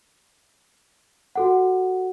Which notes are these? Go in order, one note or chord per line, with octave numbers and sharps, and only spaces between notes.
F#4 A4 F#5